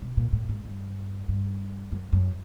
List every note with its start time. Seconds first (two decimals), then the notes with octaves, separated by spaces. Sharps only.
0.02 B2
0.17 A#2
0.33 A2
0.49 G#2
0.65 G2
1.28 G2
1.92 F#2
2.13 F#2